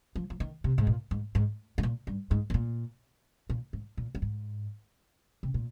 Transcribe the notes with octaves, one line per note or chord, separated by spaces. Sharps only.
F3
F3
D#3
C3
G#2
A#2
G#2
G#2
G#2
A#2
G2
G#2
G#2
A#2
A#2
G#2
A#2
G2
G#2
C3
A#2